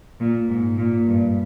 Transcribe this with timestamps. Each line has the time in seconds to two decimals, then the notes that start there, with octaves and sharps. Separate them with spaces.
0.20 A#2
0.49 G#2
0.78 A#2
1.07 G2